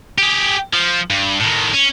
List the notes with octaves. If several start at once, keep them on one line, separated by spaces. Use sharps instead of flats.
G4 G#4
F3
G2
A2 D#3
C#4